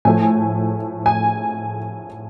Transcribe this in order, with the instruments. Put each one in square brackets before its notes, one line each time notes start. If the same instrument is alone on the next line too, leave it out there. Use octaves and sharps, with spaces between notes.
[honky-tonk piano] A2 F3 A3 G#5
G#5